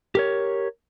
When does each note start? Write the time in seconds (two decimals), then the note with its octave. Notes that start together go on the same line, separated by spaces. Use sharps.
0.15 G4 A#4 C#5